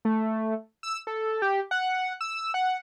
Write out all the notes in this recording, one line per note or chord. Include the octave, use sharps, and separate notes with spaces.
A3
E6
A4
G4
F#5
E6
F#5